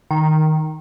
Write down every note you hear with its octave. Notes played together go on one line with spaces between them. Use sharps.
D#3